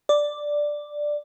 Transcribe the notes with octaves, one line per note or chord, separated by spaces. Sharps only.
D5